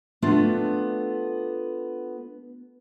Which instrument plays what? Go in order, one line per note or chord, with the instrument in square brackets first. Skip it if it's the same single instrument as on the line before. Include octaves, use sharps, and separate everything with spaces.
[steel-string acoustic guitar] A3 B3 D4 F4 A4